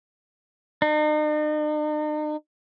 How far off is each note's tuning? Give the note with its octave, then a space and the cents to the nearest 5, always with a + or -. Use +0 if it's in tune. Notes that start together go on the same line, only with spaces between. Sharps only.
D#4 -45